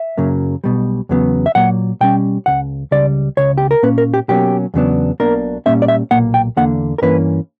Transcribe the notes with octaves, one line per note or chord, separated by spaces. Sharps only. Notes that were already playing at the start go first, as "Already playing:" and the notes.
Already playing: E5
F#2 C#3 F#3 A#3
B1 B2 G3
E2 C#3 F#3 B3
E5
A#2 F#3 A#3 F#5
B2 G3 C#4 G5
C#2 C#3 F#5
C#2 C#3 G3 D5
C#2 C#3 C#5
G4
A#4
A#2 A#3 C#4 B4
A#4
G4
B2 F#3 A#3 C#4 G4
E2 C#3 F#3 B3 D4
B1 B2 A#3 D4 A#4
A#2 G3 A#3 C#4 E5
D5
E5
B1 A#2 A#3 F#5
G5
E2 D3 A#3 F#5
A#4
G2 E3 A#3 C#4 B4